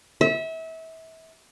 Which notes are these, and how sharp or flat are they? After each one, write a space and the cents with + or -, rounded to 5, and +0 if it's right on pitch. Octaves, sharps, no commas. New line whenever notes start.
E5 -30